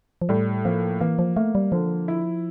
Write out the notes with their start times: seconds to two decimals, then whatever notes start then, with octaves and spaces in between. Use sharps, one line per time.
0.22 F3
0.29 A2 G3
0.65 F3 A#3
1.00 E3 A#3
1.19 F3
1.36 A3 A#3
1.55 G3
1.72 D3 F3
2.08 E4